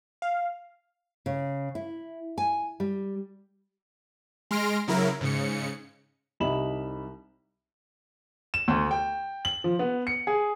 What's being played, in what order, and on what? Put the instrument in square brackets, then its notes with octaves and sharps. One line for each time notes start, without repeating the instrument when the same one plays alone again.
[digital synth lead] F5
[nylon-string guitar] C#3
E4
G#5
G3
[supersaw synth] G#3 C6 F6 A#6 D7
C#3 F#3 E4 A#4
G#2 C#3 C#7
[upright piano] C2 G3 D#4 B5 E7 F#7
E7
D2
G5
F#7
F3
B3
C#7
G#4